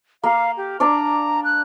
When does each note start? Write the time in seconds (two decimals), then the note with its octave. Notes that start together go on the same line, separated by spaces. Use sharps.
0.24 A#3 F5
0.57 G4
0.80 D4 D5 A#5 D6
1.44 F#6